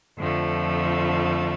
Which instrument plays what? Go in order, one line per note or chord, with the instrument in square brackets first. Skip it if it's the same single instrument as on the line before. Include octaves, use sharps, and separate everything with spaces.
[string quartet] F2 D3 F3 A3